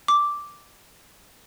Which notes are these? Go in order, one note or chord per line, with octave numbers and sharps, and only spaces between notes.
D6